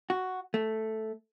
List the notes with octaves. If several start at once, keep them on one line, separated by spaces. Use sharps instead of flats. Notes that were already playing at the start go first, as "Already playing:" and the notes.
F#4
A3